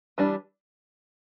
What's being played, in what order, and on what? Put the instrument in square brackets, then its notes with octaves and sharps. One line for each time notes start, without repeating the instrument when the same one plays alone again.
[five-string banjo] E3 G3 D4